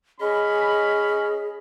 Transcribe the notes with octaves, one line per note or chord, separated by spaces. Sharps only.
C#4 G#4 D#5 B5